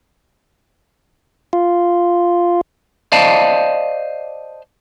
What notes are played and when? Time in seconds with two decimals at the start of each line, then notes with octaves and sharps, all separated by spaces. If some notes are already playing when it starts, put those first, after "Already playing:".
1.53 F4
3.12 C5 D5 D#5 F5 A5